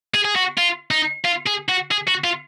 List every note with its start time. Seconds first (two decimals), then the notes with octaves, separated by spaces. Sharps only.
0.14 G#4
0.25 G#4
0.36 F#4
0.58 F4
0.91 D#4
1.25 F4
1.47 G#4
1.69 F#4
1.91 G#4
2.08 F#4
2.24 F4